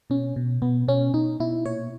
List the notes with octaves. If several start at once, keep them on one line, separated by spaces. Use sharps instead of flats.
B2 C#4
B2
B2 B3
B2 C#4
B2 D#4
B2 E4
A#2 C#5